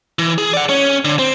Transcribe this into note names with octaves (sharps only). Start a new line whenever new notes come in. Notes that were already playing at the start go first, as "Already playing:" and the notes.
E3
G#4
D5 F#5
C#4
D3
C4